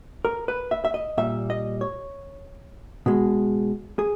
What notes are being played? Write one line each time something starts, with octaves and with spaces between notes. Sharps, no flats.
A#4
B4
E5
E5
D#5
A#2 G3 E5
D#5
C#5
B2 G#3
G#4